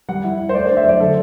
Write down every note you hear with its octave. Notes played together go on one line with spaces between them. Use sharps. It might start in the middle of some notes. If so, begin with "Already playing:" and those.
G3 F#5
E4
E4
C5
A3 D5
D4 C5
E5
F#3 D5
D3 A4